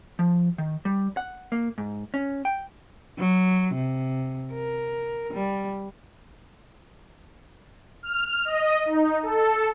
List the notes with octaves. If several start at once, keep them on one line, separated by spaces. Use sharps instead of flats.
F3
D#3
G3
F#5
A#3
G#2
C#4
G5
F#3
C3
A#4
G3
F6
D#5
D#4
A4